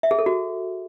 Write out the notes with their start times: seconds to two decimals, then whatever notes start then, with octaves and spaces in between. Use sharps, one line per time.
0.03 E5
0.11 G#4
0.19 A4
0.26 F#4